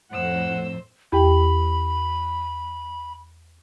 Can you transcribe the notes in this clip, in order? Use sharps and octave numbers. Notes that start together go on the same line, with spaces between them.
F2 A2 C5 F#5 E6
E2 G4 G5 B5